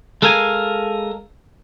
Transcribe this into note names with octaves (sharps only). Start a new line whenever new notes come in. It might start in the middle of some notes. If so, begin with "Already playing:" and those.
G#3 A4 A#4 F5 G#5